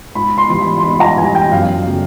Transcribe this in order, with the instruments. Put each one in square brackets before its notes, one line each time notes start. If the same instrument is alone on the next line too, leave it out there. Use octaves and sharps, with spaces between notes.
[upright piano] G#2 B5
C6
E3 G3
B5
C6
G#2 B5
A#5
E3 G3 G#5
G5
F#2 F5
C#3 F#3 A3